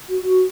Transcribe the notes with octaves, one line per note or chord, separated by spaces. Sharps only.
F#4